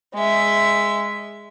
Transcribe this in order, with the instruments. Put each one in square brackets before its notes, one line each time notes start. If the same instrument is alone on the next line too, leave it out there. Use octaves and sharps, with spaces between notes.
[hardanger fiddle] G#3 E5